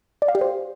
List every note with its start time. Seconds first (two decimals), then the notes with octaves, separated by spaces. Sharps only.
0.22 D5
0.28 F5
0.35 G4
0.41 C5